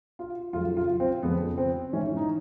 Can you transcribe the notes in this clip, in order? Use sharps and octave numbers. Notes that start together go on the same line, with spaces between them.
F4
F2 C#3 F#3 F4
F4
C4
F2 C#3 F3 B3
C4
G#2 E3 C#4
D#4